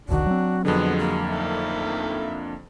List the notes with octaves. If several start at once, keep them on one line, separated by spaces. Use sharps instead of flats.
E1 C2 D#3 D4 F#4
F#3 C4
F2 D3 G#3 B3 F#4
A#3
D#3 A4 E5